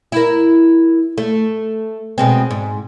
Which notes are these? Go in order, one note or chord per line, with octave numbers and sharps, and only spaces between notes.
E4 A#4
A3
B2 G#3 C4
G#2